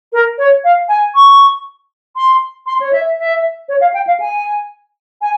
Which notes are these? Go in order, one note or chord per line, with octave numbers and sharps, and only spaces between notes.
A#4
C#5
F5
G#5
C#6
C6
C6
C#5
E5
E5
C#5
F5
G5
F5
G#5
G#5